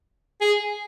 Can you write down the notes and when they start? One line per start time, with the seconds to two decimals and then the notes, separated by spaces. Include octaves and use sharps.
0.41 G#4